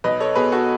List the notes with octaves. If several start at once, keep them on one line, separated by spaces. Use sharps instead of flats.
B1 B4 D#5
A4 C#5
B2 G#4 B4
F#4 A4